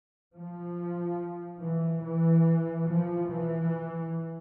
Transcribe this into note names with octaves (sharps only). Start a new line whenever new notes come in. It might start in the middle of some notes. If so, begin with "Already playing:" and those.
F3
E3
E3
F3
E3